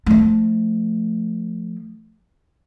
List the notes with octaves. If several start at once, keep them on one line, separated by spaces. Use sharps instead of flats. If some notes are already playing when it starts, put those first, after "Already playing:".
F3 A3